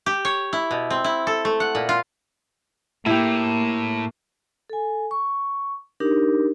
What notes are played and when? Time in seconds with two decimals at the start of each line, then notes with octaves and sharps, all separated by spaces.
0.06 G4
0.25 C#5
0.53 E4
0.71 B2
0.90 C4
1.04 E4
1.27 A4
1.45 A3
1.60 F#5
1.75 A#2
1.89 F4
3.06 A2 A#3 E4 G4
4.70 A4 G#5
5.11 C#6
6.00 D4 D#4 G4 A#4